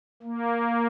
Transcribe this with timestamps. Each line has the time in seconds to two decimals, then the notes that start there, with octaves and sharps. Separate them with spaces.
0.23 A#3